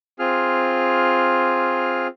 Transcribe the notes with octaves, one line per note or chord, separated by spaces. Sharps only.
C4 F4 G#4 F6